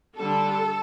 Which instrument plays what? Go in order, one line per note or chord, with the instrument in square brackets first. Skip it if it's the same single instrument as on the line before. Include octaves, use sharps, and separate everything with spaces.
[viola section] D3 G3 D4 A4